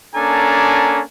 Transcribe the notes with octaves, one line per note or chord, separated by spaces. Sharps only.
A#3 C#4 D4 A4 G#5 A#5